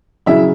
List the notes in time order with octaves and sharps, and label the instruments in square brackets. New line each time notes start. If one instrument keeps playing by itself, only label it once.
[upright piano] C#3 F#3 E4 E5